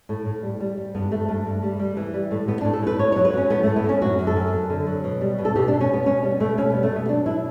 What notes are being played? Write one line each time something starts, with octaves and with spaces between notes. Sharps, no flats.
A2
A2
G3
G3
G3
G2 B3
G2 A3
G2 A3
G2
G3
G3
E3
G3
A2
A2 B3
A2 D4
A4
A2 B4
A2 C#5
C#5
F#3
B4
F#3 C#4
A2 B3
A2 A3
B3
A2 C#4
F#2 F#4
F#2
A4
F#2
F#2
D3
F#3
B2
G3
B2
A4
B2 G4
D4
B2
C#4
B2 B3
B2 C#4
G3 B3
B2 A3
B2 C#4
B3
G3
A3
B2 B3
F#3 D4
B2 E4